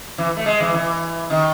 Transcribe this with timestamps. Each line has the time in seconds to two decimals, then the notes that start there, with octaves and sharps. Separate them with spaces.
0.18 E3
0.37 A3
0.46 G#3
0.60 E3
0.74 E3
1.30 D#3